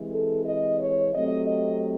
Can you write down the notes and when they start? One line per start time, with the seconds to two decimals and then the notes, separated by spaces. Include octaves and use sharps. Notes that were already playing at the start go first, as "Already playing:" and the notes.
Already playing: C3 E3 G#3
0.12 A4
0.46 D#5
0.79 C#5
1.13 C3 F#3 A3 C4 D#5
1.47 D#5